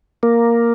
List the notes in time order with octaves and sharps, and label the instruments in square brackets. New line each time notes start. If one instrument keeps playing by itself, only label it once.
[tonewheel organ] A#3